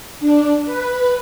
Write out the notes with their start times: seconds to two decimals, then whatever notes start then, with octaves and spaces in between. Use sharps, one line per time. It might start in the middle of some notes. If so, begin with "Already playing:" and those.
0.20 D4
0.66 B4